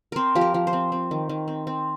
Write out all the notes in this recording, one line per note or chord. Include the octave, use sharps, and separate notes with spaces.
C4 A#4 C5
F3 G4
A#4
F3
C5
C4
C4
D#3
D#3
C4
C4